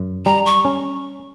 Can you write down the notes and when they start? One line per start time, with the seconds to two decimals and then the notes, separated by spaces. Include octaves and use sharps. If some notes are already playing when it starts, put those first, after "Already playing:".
Already playing: F#2
0.26 G3 A#5
0.46 C#6
0.65 C#4